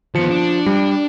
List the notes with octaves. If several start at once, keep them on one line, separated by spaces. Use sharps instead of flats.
D#3 F3 B3 C#7
D4
G3